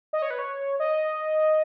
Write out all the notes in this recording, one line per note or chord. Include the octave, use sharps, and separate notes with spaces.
D#5
C#5
B4
C#5
D#5